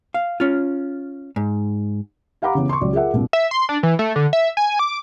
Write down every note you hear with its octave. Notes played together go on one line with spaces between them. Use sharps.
F5
C#4 F4
G#2
G4 F5 F#5 A#5 B5 D6
C#3 E3 B3
C6 C#6
C#2 F#3 D5
F4 G#4 A#4 E5 F#5
C2 G2 A#2
E5
C6
D4
E3
A3
D3
E5
G#5
D6